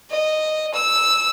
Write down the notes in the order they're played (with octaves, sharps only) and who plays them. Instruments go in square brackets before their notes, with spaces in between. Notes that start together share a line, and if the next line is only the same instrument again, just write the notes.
[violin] D#5
E6